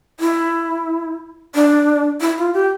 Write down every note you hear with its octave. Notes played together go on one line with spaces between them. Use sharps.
E4
D4
E4
F4
G4